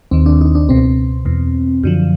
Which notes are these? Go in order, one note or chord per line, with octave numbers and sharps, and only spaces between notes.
D#2 D#3 C4
D4
D#4
D4
C#2 B2 C4
E2 B2
F#2 D3 F3